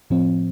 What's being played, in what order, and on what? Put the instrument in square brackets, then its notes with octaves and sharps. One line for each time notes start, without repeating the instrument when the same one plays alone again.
[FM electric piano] A2 F3 C4